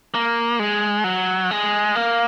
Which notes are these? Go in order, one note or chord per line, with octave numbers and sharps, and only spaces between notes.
A#3
G#3
F#3
G#3
A#3